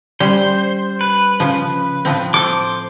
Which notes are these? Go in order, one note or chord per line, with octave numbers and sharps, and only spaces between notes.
G3 C#4 C5
B4
C#3 F3
A2 F3 C4
A4 C5 D6